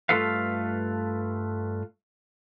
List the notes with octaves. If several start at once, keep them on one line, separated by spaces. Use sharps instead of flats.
G2 A3 F4 A4 B4 F5